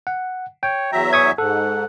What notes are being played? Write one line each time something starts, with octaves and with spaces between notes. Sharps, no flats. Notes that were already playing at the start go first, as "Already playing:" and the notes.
F#5
C#5 G5
E2 F#3 E5 A#5
G#5 C#6 D#6 G#6
G#2 A4 F#5